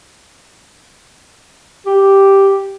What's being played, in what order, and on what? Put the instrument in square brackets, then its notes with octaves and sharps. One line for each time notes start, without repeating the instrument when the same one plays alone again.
[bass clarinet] G4